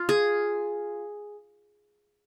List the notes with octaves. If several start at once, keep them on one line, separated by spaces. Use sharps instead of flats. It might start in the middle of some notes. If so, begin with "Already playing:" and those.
Already playing: F4
G#4